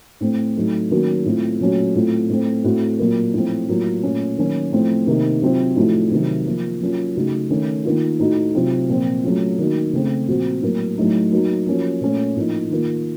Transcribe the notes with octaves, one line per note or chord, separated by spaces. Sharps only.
A2 A3 C4
A2 F#3 A3 D#4
D#3 F#3 A#3 C#4 F#4
A2 A3 C4 F4
A#2 F#3 A3 C#4 F#4
A2 A3 C4 F4
A2 A3 C4
A2 A3 C4 F#4
A#2 F#3 A#3
A2 F3 A3 C4
A2 F#3 A#3 F4
A#2 A3 C#4
D#3 F#3 A#3 C#4
A2 F3 A3 C4
C3 D#3 A#3 D#4
C3 F#3 C4 F4
A2 F3 A3 D#4 F#4
C3 D#3 F#3
F3 A#3 F4
F#3 A#3 C#4 F4
C#3 A3 D#4 F#4
D#3 A3 C#4
D#3 A#3 F4
A2 A3 D#4 F#4
C3 F#3 C4 F4
A#2 F3 C4
F#3 A3 C#4 F4
D#3 A#3 D#4 F#4
C#3 A3 C4
A#2 F3 C4 F#4
A2 F#3 A#3
A2 F#3 A3 D#4
F#3 A#3 D#4 F#4
F3 A#3 C#4 F#4
A#2 A3 C#4
A2 F3 A#3 D#4
D#3 A#3 F4